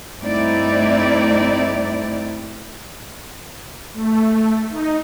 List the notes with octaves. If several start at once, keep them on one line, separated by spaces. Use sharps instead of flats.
G2 A3 C4 D#4 E4 D5
A3
D#4